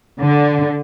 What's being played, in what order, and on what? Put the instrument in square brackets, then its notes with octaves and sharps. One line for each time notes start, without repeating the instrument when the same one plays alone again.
[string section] D3